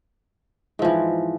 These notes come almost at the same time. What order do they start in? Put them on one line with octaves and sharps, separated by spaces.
G#2 F3 E3